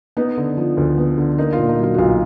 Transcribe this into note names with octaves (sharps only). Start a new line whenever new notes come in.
B3 D#4
D3
F3
D2
B3
D3
A#3 D#4
F4
A#2
D#4
F#3 F4
F#4
B1 F4